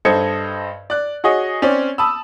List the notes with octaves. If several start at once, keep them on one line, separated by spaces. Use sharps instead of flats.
G2 A4 C5 D#5 G#6 C#7
D5 F#6
F#4 G#4 C#5 D#5
C4 C#4 D5
A5 B5 D#6 E6